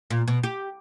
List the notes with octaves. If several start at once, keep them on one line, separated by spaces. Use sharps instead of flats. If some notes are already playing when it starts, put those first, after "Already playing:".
A#2
B2
G4